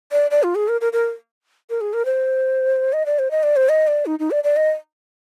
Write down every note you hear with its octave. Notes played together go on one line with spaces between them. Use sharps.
D5
D5
F4
G#4
A#4
A#4
A#4
A#4
G#4
A#4
C5
D#5
D5
C5
D#5
D5
C5
D#5
D5
D#4
D#4
D5
D5
D#5